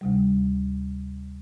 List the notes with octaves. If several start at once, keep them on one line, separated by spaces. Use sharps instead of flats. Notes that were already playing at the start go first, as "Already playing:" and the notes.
D2 C3 G3